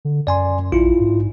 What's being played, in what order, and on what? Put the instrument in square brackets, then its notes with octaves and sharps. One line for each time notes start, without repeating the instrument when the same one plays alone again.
[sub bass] D3
[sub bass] F#2 [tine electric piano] D5 G#5 C6
[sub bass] A#1 [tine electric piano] E4 F4
[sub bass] G#2